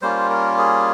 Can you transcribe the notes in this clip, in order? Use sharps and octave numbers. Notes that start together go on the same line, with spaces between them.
G3 A#3 C#4 F4 C5
A#4
G#4